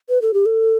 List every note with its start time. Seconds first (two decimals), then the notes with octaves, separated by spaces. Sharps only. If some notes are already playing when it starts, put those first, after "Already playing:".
0.09 B4
0.22 A4
0.34 G4
0.46 A4